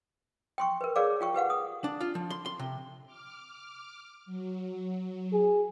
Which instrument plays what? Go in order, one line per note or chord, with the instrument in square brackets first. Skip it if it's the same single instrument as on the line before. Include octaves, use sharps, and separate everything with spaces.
[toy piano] G5 C6 C#6
A#4 B4
G#4 A#4 C#5 D5 F5 D6
F4 G5 C#6
G4 B4 F5 F#5
D#6
[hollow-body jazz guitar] D4
F4
F3
C6
C6
C3
[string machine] D6 F6
F#3
[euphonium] G#4